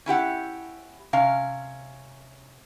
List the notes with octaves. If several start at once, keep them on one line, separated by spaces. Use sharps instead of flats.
C#4 E4 G4 F#5
C3 C#4 F5